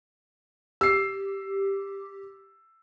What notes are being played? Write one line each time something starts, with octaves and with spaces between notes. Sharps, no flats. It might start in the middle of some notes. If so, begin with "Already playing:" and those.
G4 E6 C7